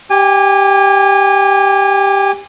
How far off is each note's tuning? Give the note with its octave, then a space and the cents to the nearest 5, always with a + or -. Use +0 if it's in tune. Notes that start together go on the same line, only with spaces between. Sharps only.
G4 +0 G#5 -30